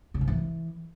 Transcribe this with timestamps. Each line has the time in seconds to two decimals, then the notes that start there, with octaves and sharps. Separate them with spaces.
0.14 C#3
0.21 G#2
0.28 E3